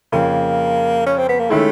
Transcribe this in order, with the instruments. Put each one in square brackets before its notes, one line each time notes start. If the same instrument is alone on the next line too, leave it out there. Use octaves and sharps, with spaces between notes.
[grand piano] F2 C#3 F3 [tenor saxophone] A#3
[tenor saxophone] C#4
C4
B3
A#3
[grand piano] D#3 G#3 C#4 E4 [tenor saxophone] A3